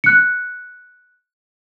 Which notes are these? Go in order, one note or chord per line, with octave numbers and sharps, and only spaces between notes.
F#6 C#7